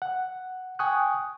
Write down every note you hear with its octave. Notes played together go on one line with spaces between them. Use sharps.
F#5
G5 G#5 C#6 D#6 F#6